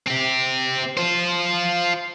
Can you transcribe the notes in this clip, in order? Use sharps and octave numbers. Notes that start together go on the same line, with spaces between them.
C4 G4
F4 C5